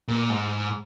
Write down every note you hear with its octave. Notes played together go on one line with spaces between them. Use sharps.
A#2
G#2